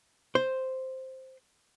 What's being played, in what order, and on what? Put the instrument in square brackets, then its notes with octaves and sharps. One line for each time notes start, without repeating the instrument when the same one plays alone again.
[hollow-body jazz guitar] C5